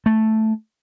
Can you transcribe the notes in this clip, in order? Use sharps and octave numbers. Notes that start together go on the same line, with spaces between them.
A3